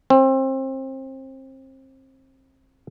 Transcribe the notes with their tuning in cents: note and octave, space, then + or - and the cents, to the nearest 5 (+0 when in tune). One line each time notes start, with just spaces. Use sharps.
C4 +30